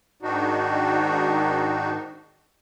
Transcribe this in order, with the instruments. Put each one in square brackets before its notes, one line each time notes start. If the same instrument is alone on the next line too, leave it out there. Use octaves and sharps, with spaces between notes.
[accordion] G#2 D#3 D4 D#4 F#4